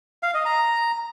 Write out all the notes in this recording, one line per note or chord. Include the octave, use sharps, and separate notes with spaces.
F5
D#5
A#5